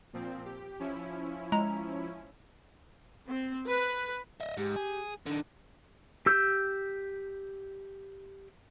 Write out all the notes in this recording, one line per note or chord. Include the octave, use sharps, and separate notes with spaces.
A#2 F3 C4
G4
F3 C#4 E4
G#3 A#5
C4
B4
D#5 E5
G#2 G4
G#4
D3 D#3 D4
G4 E6 G6